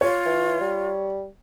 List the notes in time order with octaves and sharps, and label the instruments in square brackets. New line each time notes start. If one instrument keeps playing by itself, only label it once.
[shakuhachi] F4 [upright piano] C#5
[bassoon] E3
G3